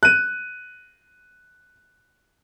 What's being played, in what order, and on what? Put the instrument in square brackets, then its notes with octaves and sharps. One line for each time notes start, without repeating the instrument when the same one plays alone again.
[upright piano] F#6 D#7